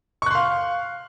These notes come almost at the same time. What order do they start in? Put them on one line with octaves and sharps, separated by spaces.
C#6 F#6 C6 F5